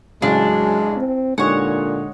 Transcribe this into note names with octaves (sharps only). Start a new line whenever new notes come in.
A1 C#3 F#3 G#3 D4
C4
A#2 D3 G#3 D#4 G4 C#5 F#5